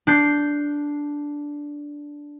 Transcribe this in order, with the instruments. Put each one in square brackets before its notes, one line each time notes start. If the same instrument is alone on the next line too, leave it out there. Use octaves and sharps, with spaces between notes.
[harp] D4 G6 C7